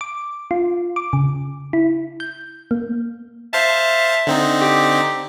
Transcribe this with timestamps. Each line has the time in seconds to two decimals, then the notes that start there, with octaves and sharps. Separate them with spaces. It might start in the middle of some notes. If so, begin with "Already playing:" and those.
0.01 D6
0.51 F4
0.96 D6
1.13 C#3
1.73 E4
2.20 G6
2.71 A#3
3.53 C5 E5 F5 A5
4.27 D3 C4 D#4
4.61 G4